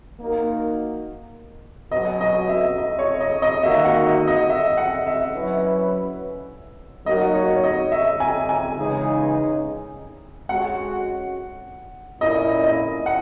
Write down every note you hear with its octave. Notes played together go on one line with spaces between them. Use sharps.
A#3 D#4 F#4 A#4
B2 F#3 C#4 F#4 D#5
D#5
E5
D#5
C#5
D#5
D#5
D#3 A#3 D#4 F#4 E5
F#5
D#5
D#5
E5
F#5
E5
F#3 C#4 E4 B4
F#3 A#3 D#4 F#4 A#4 D#5
C#5
C#5
D#5
E5
G#5
G#5
C#3 E3 G#3 D#4 G#4
G#3 C#4 F#4 F#5
A#2 A#3 C#4 E4 D#5
D#5
F#5